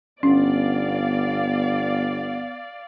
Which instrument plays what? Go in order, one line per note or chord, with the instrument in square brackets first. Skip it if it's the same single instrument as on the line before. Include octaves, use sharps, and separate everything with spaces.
[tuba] G1 [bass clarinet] B3 [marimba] C#4 [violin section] D5 F5